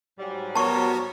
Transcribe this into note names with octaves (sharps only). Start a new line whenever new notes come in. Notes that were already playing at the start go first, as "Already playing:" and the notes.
G#2 F#3 G3
B3 F#4 A#4 C#5 A5 C#6